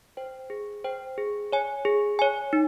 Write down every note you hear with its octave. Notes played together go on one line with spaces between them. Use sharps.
C5 G5
G#4
C5 G5
G#4
C#5 G#5
G#4
C#5 G#5
D#4